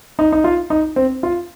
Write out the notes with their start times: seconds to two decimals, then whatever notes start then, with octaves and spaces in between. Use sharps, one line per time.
0.19 D#4
0.32 D#4
0.44 F4
0.70 D#4
0.96 C4
1.23 F4